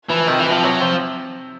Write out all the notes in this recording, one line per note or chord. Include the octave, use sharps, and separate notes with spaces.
E3 F3
C3 D#3
E3
C3
F3
C3 F#3
C3 F3